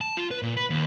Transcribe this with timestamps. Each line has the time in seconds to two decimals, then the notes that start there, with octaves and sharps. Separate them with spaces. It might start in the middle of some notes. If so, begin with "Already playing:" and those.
0.01 A5
0.17 F4
0.31 B4
0.42 A#2
0.57 B4
0.70 D#2